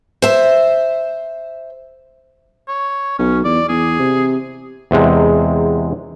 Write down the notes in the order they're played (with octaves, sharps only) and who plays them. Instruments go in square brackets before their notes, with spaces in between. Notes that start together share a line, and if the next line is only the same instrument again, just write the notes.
[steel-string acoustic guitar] C5 E5
[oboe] C#5
[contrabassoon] B1 [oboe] C#4
[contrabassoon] E2 [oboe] D5
[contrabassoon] E2 [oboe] G#4
[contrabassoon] C3
[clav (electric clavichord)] E2 C3 G#3